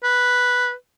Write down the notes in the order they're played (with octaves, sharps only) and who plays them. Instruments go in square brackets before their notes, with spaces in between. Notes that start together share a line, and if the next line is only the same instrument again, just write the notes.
[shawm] B4